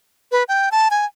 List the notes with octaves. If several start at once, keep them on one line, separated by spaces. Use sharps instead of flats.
B4
G5
A5
G#5